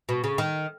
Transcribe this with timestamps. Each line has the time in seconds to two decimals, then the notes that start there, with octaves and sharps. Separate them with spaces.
0.09 B2
0.24 C#3
0.38 D#3